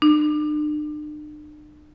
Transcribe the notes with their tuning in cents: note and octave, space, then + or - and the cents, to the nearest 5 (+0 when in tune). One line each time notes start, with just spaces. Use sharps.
D4 +45